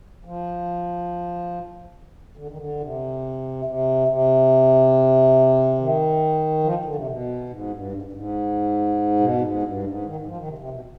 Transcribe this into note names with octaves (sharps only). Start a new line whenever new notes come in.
F3
D3
D#3
D3
C3
C3
C3
D#3
F3
D3
C3
B2
G#2
G2
G#2
G2
G#2
B2
G#2
G2
G#2
D#3
G#2
F3
D#3
C3
C3
B2